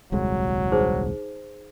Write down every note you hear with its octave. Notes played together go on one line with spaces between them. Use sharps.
D#1 C2 F#3 G#3
D#4 G#4 C5